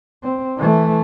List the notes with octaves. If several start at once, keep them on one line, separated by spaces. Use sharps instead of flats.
C4
E3 A3